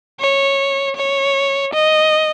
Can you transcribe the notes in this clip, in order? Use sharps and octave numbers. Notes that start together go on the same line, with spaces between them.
C#5
C#5
D#5